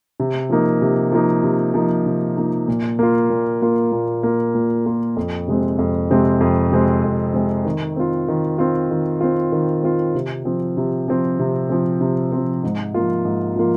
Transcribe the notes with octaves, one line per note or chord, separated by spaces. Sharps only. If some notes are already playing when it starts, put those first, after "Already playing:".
C3
F3 A#3 D#4
C3
F3 A#3 D#4
C3
F3 A#3 D#4
C3
F3 A#3 D#4
A#2
A#3 F4
A#2
A#3 F4
A#2
A#3 F4
A#2
A#3 F4
F2
C3 G#3 C4
F2
C3 G#3 C4
F2
C3 G#3 C4
F2
C3 G#3 C4
D#3
C4 F4
D#3
C4 F4
D#3
C4 F4
D#3
C4 F4
C3
F3 C4
C3
F3 C4
C3
F3 C4
C3
F3 C4
G#2
F3 A#3 F4
G#2
F3 A#3 F4